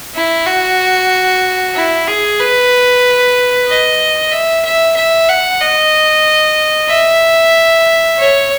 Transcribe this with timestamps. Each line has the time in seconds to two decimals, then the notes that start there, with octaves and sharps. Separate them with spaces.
0.15 E4
0.46 F#4
1.75 E4
2.08 G#4
2.40 B4
3.68 D#5
4.31 E5
4.64 E5
4.96 E5
5.28 F#5
5.60 D#5
6.89 E5
8.18 C#5